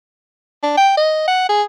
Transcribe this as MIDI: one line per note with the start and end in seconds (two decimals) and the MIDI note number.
0.63 0.74 62
0.77 0.95 79
0.97 1.23 75
1.28 1.46 78
1.49 1.63 68